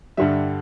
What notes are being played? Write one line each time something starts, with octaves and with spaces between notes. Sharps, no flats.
G2 D3 G3 E5